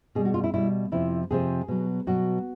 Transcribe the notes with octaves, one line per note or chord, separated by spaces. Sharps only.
B2 G3 G#4
F#4
F4
E4
B2 G3 E4
F2 C3 F3 E4
F2 C3 F3 G#4
B2 F#3
B2 F#3 F#4